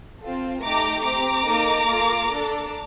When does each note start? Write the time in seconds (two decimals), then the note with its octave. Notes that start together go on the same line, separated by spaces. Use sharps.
0.21 C4 F4 A4
0.62 A3 D#4 G4 A#5 D6
1.03 C4 G4 A#5 D6
1.45 A#3 D#4 A4
1.86 A#3 F4 A4
2.28 D4 A4